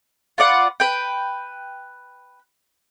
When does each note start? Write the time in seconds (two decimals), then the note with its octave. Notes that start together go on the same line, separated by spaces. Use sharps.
0.38 F4 B4 D5 F#5
0.80 B4 G5